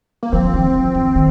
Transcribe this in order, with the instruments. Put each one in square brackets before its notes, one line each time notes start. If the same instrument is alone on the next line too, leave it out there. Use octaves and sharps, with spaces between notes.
[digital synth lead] A#3
[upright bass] F3 [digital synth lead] C4
[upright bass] D#3
F3
D#3
D#3